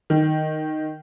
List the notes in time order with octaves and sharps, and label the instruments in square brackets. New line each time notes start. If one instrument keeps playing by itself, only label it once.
[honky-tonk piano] D#3